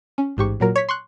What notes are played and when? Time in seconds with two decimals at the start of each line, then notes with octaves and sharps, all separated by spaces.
0.18 C#4
0.37 A1 G#2 G4 C#6
0.60 A#2 F#3 A#4
0.76 C#5 B6
0.89 C6 C#6 F#6